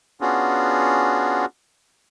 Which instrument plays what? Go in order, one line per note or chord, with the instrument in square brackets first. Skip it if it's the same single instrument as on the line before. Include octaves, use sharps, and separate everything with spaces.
[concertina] B3 C#4 D4 F4 F#4 G#4